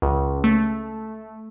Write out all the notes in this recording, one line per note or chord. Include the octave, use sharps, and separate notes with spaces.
C#2
A3